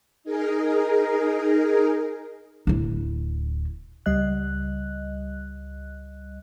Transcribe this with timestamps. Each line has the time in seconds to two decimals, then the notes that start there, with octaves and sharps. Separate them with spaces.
0.24 D#4 G#4 A#4
2.67 D1 E4
4.06 C#2 G3 D#5 F#6